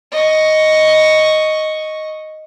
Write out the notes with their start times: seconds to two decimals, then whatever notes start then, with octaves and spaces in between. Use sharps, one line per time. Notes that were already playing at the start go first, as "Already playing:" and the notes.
0.12 D#5 C#6